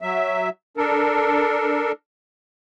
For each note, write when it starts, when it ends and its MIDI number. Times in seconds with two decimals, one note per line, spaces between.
0.02 0.49 54
0.02 0.49 76
0.77 1.92 62
0.77 1.92 69
0.77 1.92 70